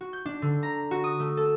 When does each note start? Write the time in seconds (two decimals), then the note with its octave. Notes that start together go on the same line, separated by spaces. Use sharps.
0.01 F#4
0.13 G6
0.26 D4
0.42 D3
0.63 A#5
0.91 F#4
1.04 D#6
1.20 A3
1.37 A4